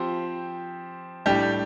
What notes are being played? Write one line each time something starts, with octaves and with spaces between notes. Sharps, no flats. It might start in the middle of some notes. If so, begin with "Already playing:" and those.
Already playing: F3 C4 G4
A2 G3 D4 G4